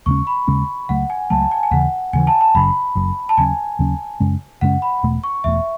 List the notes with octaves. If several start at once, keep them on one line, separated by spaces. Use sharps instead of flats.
D#2 C#3 G#3 C#4 C#6
B5
D#2 C#3 G#3 C#4
C#2 C#3 F#3 A3 F#5
G#5
C#2 C#3 F#3 A3 A5
G#5
G#5
D#2 C#3 E3 F#5
D#2 C#3 E3 G#5
A5
A5
F#1 F#2 C#3 B5
F#1 F#2 C#3
A5
D#2 C#3 F#3 C#4 G#5
D#2 C#3 F#3 C#4
F#2 C#3 G#3 C#4
F#2 C#3 G#3 C#4 F#5
B5
E1 E2 B2 A3
C#6
E1 E2 B2 A3 E5